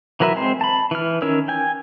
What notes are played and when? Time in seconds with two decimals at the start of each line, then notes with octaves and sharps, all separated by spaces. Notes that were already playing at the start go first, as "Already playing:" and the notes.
0.20 E3 F#3 A#4 B4 E5
0.36 G#3 C4 C5
0.61 A5 B5
0.91 E3 F6
1.22 D#3 C#4 A#4 C#5 E6
1.48 G5 G#5